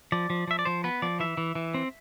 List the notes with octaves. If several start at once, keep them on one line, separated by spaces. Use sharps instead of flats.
F3 D5
F3
F3 E5
D5
F3 C5
B3 B4
F3 D5
E3 E5
E3
E3
C4